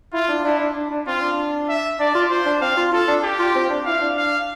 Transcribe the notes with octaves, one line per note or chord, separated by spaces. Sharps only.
E4 F4
D4
D4 E4
D4
D4
D4
C4 F4
D4
E5
D4 D5
F4
C5
D4
C4 F5
F4
F4 A4
D4
G4
F4
C4
D4
E4 F5
D4
F5